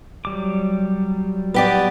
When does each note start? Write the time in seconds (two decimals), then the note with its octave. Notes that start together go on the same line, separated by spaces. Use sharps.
0.25 F#3 G3 D6
1.54 B3 G4 D5